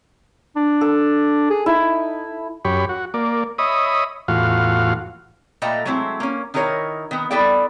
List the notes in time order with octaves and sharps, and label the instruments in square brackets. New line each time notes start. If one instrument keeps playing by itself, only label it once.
[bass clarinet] D4
[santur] A4
[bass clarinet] G#4
[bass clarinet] D#4 [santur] E4
[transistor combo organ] F#2 G4 C#5 B5
F#4
A#3 D5
C#5 D#5 E5 B5 D#6
E2 A2 F4 F#4 F5
[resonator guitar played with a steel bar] A#2 A3 A4 D#5 G5 A#5
F#3 G#3 A3 C4 E4
A#3 C#4
D#3 D#4 E4 A#4 C#5
D#3 B3
B3 E4 A4 D5 G5